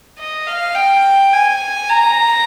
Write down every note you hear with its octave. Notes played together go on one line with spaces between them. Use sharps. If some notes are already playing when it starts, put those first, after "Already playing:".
D#5
F5
G5
G#5
A#5